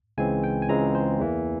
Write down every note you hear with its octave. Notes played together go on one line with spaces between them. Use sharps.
C#2 C#3 E3 G#3 C4 G#5
G5
G#5
C#2 C#3 E3 G#3 C4 A#5
C5
E2 E3 A#3